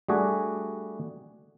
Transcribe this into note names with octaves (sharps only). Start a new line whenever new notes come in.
G3 A3 D4 F#4 G#4